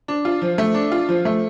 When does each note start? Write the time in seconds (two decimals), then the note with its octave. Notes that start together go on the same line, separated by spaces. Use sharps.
0.08 D4
0.25 F4
0.42 F3
0.58 A3
0.74 D4
0.92 F4
1.09 F3
1.25 A3